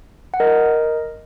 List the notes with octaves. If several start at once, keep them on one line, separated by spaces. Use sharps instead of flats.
F#5
A#4 D#5